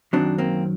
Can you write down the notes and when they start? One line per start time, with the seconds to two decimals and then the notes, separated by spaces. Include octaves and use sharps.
0.13 F#2 D#3 F#3 C4 D4
0.38 A#3 C4